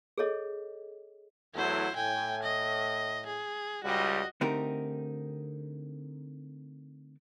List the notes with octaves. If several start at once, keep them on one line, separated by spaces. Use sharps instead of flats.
G#4 A4 C#5 D#5
E2 F#3 A3 E4 C5
A2 G5 G#5
D#5
G#4
C#2 G3 F#4 D#5
D3 A3 C4 D#4 G4 A#4